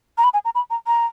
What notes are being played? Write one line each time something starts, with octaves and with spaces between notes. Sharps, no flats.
A#5
B5
G#5
A#5
B5
A#5
A#5